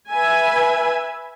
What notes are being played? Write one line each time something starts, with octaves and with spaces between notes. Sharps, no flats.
B4 E5 G#5